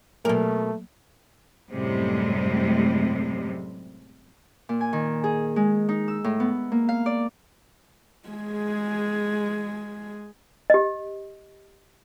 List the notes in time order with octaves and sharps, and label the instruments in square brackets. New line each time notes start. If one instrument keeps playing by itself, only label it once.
[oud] B2 A#4 [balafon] F#3 A#3 [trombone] A3
[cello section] F#2 A2 C3 G3 G#3
[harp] A#2
G#5
D#3
G#4
G#3
D#4
E6
A2
B3
A#3
F5
D5
[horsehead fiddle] G#3 G#4
[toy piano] G4 D#5